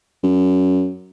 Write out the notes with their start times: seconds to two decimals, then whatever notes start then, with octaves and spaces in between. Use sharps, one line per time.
0.23 F#2